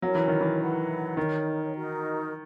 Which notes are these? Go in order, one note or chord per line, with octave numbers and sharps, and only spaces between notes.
F#3 C#4 E4 A#4 C#5
E3
D#3
E3
E4 B4 F#5
D#3 D#4 A#4 C#5
D#4 F#4 A#4